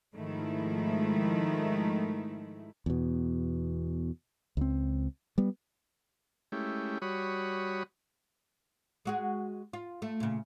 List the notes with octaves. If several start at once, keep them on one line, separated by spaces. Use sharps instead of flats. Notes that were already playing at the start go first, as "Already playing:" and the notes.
G#2 D#3 F3 G#3 A3 E4
E2 B2
C#2 C4
G3 B3
G#3 A3 C#4 E4 G4
G3 F#4 C#5 B5 D#6
G#3 F#4 G#4
F4
A3
A#2 C#3